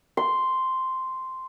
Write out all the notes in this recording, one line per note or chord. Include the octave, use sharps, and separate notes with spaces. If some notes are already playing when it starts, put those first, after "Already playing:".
C6